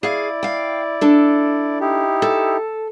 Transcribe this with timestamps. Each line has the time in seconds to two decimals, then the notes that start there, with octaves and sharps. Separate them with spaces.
0.03 E4 G#4 D5 F5
0.43 F5 G5
1.01 D4 A4
1.81 D#4 E4 G4
2.22 A4